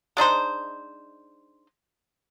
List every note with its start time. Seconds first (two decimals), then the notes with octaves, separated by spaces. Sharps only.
0.17 G#3 D4 D#4 C5